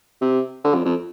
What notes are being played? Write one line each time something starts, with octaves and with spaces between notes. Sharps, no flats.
C3
D3
F2
F2